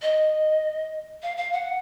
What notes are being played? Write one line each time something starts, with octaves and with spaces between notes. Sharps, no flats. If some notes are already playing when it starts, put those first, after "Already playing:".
D#5
F5
F5
F#5